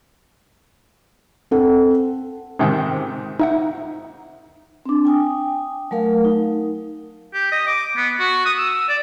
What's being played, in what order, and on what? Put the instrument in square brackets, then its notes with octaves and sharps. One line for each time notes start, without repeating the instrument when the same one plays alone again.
[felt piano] C4 A4 F#5
[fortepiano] G#2 C3 D#3
[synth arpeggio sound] D#4 E5 F#5
[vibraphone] C4 D4
G5 G#5 D#6
F#3 A3 A#4 F5
D#4
[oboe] G4
D#5
D6
B3
F#4
D#6
E6
D5